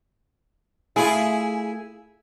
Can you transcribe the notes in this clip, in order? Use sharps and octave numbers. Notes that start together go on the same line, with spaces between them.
A3 E4 F4 G#4